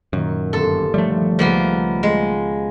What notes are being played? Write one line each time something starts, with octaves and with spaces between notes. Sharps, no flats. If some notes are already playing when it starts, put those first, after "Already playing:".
F#2 A#2 D#3
G1 B3 A4 C6
F3 G3 A3 C#5 E5
C#2 F3 A#3 B3
G#3